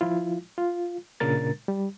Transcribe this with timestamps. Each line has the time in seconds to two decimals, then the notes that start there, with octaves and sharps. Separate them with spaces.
0.01 F3 E4 F4
0.58 F4
1.20 A#2 C#3 D4 A#4 A6
1.68 G3